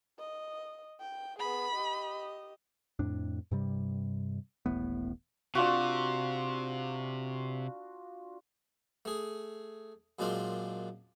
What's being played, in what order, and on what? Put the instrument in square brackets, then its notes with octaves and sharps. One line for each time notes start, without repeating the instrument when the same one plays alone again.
[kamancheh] D#5
G5
[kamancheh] B3 G#4 [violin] B5
[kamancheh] G4 D#5
[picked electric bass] F2 A2 D4
G2 C3 G3
D#1 A1 A2 B3
[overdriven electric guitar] C3 [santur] D4 F4 F#4
[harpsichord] A3 G#4
F#2 A#2 G#3 C4 D4 F4